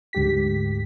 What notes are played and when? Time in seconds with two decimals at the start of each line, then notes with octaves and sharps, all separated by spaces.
0.13 D2 G#2 G4 B6